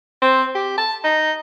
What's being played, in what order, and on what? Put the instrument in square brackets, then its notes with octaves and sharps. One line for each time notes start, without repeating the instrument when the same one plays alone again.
[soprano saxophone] C4
G4
A5
D#4